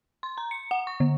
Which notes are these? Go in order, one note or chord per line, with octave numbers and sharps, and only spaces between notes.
C6
A#5
C#7
F#5
C#6
D3